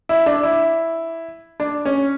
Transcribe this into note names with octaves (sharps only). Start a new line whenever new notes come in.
E4
D4
E4
D4
C#4